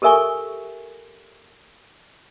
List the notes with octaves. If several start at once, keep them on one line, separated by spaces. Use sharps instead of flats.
G4 A4 A#4 E5 G#5 C#6